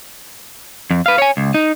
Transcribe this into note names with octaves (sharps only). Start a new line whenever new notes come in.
F2
B4 F5
C#5 G#5
C#2
D#4